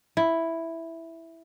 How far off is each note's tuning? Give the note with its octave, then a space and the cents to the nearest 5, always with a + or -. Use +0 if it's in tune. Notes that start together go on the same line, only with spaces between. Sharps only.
E4 +0